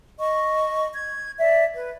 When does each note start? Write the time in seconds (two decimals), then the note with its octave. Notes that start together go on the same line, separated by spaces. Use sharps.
0.18 D#5 C#6
0.93 G#6
1.39 D5 E5
1.75 B4